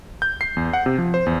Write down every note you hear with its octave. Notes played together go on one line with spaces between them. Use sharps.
G6
C7
E2
F#5
C3
F3
C5
E2